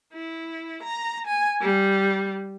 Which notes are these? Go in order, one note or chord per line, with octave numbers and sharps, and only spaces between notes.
E4
A#5
G#5
G3